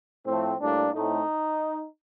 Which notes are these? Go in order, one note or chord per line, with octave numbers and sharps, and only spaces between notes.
A2 F3 A3 C4
A2 G3 A#3 D4
A2 A3 C4 D#4